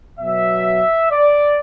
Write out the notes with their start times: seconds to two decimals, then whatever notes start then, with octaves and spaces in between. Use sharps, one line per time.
0.19 B2 F#3 E5
1.10 D5